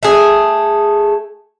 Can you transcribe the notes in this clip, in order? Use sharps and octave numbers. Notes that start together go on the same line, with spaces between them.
A3 G#4